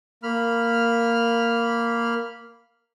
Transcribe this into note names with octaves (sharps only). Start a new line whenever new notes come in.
A#3 B5 F6